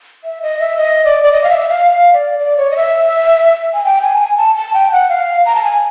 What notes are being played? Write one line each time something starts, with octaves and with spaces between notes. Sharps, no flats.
E5
D#5
E5
D#5
D5
D5
D#5
F5
E5
E5
F5
F5
D5
D5
C#5
D#5
E5
G#5
G5
G#5
A5
G#5
A5
A5
G5
F#5
F5
A#5
A5
G#5